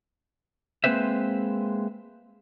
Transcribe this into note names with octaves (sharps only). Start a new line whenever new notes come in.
G#3 A#3 C4 B4 C5 E5